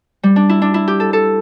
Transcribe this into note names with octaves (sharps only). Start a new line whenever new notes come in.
G3
D4
E4
D4
E4
G4
A4
A4